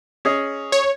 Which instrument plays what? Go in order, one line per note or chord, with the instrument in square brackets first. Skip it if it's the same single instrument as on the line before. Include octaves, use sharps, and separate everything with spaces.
[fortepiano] C#4 G#4 D#5
[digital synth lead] C#5